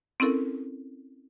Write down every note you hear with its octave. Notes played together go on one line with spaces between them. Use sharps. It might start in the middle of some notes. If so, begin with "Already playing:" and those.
C4 C#4 E4 A4 A#4